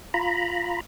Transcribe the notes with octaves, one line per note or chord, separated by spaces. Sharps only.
F4 A#5 B5